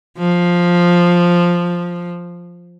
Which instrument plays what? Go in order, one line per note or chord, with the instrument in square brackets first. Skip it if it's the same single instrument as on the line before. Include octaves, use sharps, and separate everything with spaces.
[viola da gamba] F3